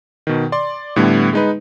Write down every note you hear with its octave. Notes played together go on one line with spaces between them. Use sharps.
B2 D#3
D5 C6
A2 D3 G3 A3 B3
G#3 D#4 B4